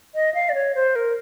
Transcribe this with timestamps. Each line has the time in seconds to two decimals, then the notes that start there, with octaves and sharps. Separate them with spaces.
0.15 D#5
0.34 F5
0.49 D5
0.54 C#5
0.75 C5
0.96 A#4